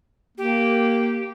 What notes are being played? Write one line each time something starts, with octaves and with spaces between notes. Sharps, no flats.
A#3 G4